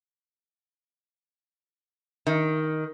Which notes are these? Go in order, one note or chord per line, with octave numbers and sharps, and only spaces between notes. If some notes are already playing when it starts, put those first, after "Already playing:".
D#3